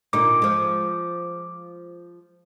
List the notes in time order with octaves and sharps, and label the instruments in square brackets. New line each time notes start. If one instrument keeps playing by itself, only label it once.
[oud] A#2 D3 D#4 [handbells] D6
[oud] F3 G#3